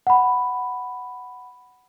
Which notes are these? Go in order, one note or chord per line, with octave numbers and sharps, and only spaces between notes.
F#5 B5